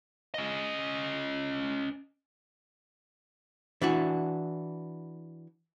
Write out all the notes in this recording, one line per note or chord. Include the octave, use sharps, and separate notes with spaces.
C#4 D#5
E3 D4 F#4